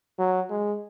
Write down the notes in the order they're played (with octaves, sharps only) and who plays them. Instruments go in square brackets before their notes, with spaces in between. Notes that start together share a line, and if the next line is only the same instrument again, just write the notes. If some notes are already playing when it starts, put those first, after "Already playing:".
[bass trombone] F#3
G#3